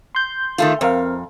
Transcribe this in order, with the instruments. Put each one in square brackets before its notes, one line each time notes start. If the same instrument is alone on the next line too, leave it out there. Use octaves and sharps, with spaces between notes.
[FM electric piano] C6 G6
[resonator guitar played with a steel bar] D#3 A3 F4
[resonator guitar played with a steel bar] F2 [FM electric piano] C4 A#4 F5